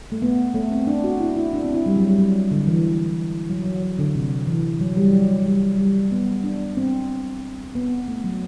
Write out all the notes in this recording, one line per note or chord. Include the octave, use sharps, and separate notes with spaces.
A3
B3
A3
C4
D4
F#4
E4
E4
D4
C4
E4
G3
F#3
G3
F#3
D3
E3
F#3
F#3
F#3
D3
C3
E3
F#3
G3
F#3
G3
G3
B3
D4
C4
B3
A3
F#3